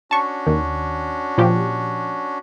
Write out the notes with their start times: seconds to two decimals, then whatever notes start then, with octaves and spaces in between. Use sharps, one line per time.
0.11 C#4 D4 F#4 A5 C#6
0.47 D#2 D#3
1.38 A#2 F3 G4